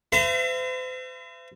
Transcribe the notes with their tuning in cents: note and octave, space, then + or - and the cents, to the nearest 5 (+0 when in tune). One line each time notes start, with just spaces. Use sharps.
C5 -45 E5 +40 A#5 -35